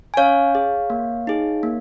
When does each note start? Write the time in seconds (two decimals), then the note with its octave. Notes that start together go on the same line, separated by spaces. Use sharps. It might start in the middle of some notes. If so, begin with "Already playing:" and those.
0.14 G#5
0.17 C#4 C#5 F5
0.55 G#4
0.90 A#3
1.27 D#4 G#4
1.63 A#3